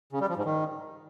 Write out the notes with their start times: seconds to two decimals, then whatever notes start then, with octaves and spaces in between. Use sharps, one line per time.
0.13 C#3
0.21 G3
0.29 F3
0.37 G#2
0.45 D#3